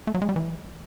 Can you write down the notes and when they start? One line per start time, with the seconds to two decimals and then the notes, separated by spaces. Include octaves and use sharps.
0.07 A3
0.14 F#3
0.22 G#3
0.29 G3
0.36 E3